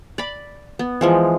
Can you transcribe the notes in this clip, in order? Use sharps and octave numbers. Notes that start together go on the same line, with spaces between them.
D5 B5
B3
E3 F3 G#3